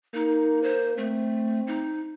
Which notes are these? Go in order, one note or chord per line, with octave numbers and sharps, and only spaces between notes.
A#3 D#4
C5
A3 C4
D#4